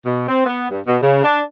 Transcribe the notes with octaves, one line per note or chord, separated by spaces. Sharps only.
B2
C4
B3
G2
B2
C#3
D4